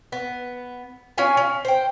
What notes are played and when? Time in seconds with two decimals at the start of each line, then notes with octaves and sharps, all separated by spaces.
0.12 B3
1.18 C#4 F4 G#5
1.37 C#4
1.65 C5 G5